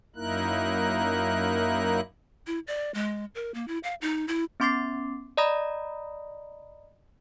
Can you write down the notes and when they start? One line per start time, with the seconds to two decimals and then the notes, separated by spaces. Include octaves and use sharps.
0.16 F#2 A#3 D#4 E4 A#4 F#6
2.47 E4
2.67 D5
2.94 G#3
3.35 A#4
3.54 A#3
3.68 E4
3.83 F5
4.01 D#4
4.28 E4
4.60 B3 C#4 C6 D6 A6 C7
5.37 D5 D#5 A#5 B5 D#6 A#6